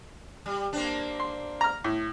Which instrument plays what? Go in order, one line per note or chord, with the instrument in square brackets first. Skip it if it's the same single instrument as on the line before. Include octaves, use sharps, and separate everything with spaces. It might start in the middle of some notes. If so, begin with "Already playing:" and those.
[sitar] G3
A#3 C4 D4
[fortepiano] C6
A#5 F6
A2